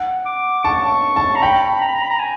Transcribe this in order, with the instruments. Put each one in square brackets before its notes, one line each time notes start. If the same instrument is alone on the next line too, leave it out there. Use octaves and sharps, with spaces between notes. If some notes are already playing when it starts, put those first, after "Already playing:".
Already playing: [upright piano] F#5
[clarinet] D6
[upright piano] A5 [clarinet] C#6
[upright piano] A5
[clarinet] A#5
[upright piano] G5 [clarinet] B5
[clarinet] A#5
B5
A#5
B5
A#5
G#5